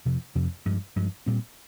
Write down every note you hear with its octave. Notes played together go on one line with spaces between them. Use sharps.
F2 C3 F3
F2 C3 F3
G2 F3 G#3
G2 F3 G#3
A#2 G3 C4